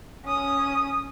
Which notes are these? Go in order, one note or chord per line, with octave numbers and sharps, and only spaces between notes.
C#4 D#6